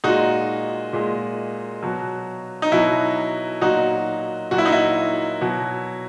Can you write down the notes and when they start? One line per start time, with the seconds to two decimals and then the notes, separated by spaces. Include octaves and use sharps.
0.04 A#2 G#3 D#4 F#4
0.93 A#2 G#3
1.83 B2 F#3
2.62 D#4
2.72 B2 F#3 E4
3.61 A#2 F#3 D#4 F#4
4.51 A#2 F#3 F#4
4.58 E4
4.65 D#4
4.72 E4
5.41 B2 F#3